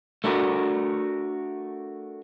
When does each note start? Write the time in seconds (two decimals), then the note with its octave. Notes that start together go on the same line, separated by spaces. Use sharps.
0.24 A3 D4 F#4 A#4